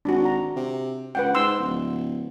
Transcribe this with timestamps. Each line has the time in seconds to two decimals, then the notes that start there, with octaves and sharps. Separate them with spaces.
0.05 G#1 D4 F#4
0.25 A#5
0.56 C3
1.15 C#2 B4 F#5 G5
1.35 G#2 C6 E6
1.59 D1